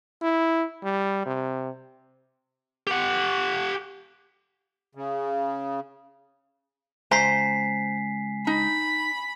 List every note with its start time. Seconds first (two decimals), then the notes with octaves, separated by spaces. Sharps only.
0.22 E4
0.83 G3
1.26 C3
2.87 G4 F#5
4.95 C#3
7.11 C#2 C5 E5 G#5 A#5 C6 B6 C7
8.47 D#4 B5